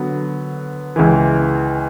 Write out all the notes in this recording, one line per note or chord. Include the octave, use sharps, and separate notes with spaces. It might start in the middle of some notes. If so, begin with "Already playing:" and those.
Already playing: D3 F#3 B3
C#2 C#3 E3